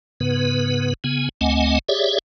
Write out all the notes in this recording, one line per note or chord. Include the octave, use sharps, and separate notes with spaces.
G#2 C#3 B3 B4
C#3 B3 G#5
D2 A3 C4 D#5 F#5 G#5
G4 G#4 C#5 D5 E5